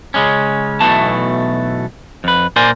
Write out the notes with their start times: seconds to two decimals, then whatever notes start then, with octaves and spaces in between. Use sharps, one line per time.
0.14 C#3 G#3 C#4
0.81 B1 B2 E3 A3 A5
2.24 F2 B4
2.56 A#2 A#4 C5 D5 G#5